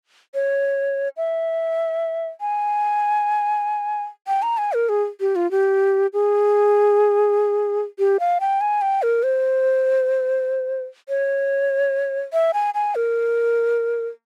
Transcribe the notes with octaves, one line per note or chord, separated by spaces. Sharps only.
C#5
E5
G#5
G5
A#5
G#5
A#4
G#4
G4
F4
G4
G#4
G4
F5
G5
G#5
G5
A#4
C5
C#5
E5
G#5
G#5
A#4